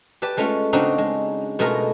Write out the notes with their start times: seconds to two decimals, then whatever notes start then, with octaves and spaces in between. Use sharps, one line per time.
0.22 G4 B4 D5 A5
0.37 G#3 A3 C#4 F4
0.73 C#3 C4 D4 D#4 F#4 F5
0.98 G#3
1.59 B2 G#3 A3 F4 G#4 A#4